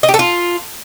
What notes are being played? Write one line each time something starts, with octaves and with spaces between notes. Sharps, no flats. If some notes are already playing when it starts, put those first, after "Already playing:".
D#5
G4
A4
F4